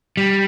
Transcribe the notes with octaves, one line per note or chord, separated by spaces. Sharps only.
G3